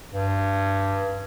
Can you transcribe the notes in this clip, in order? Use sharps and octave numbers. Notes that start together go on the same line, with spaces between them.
G2